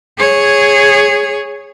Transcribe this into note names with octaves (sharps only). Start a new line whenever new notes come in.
G#4 C#5